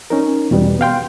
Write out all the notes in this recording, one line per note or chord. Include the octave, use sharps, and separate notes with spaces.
C#4 D#4 A#4
E2 B2 G3 B3
B3 F5 G5 C6